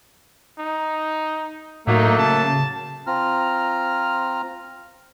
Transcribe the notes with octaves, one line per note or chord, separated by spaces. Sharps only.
D#4
A2 F#3 A3 A#3 D#4
C#3 A5
C4 F4 A#5 F6